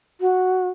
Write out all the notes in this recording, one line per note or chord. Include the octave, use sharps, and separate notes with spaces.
F#4